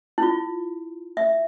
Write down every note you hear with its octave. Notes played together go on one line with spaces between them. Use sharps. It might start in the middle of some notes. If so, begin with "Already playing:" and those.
E4
F4
E5